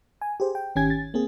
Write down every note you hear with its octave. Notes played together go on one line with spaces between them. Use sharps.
G#5
G4 G#4 C5
G5
G#1 D#3 C#4 G4 G#5 G#6
A6
A#3 C4 G#4